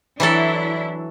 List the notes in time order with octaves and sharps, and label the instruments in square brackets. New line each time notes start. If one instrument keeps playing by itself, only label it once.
[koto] E3 F#3 A4 [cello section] D4 E4